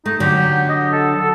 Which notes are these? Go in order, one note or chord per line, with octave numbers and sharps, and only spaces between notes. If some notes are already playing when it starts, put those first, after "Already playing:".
A3 D#4
D3 F#3 G4
D#5
A4
A4